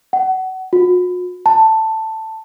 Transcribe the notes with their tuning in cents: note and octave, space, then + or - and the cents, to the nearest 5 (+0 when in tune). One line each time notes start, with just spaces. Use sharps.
F#5 +25
F#4 -45
A5 +10